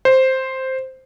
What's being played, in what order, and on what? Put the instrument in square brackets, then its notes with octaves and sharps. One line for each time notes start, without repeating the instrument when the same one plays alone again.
[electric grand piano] C5